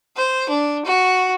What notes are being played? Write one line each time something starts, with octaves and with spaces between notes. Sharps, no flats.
C5
D4
F#4